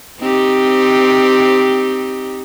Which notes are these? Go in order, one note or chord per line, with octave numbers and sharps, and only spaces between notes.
C4 D#4 G4